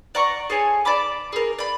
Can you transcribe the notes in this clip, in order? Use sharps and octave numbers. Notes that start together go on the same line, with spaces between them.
D5 F#5 A#5 C#6
G#4 A4 C#5 G#5
D5 A5 B5 D6
G#4 A#4
D5 B5